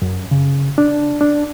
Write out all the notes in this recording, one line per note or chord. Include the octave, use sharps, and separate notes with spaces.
F#2
C#3
D4
D4